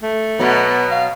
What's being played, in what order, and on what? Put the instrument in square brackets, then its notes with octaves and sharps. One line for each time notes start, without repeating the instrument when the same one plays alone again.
[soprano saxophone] A3
[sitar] B2 F#3 [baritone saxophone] B3
[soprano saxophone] F5